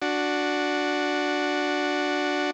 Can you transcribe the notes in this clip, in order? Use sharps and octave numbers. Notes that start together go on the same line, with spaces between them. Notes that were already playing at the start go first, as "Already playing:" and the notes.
D4 F#4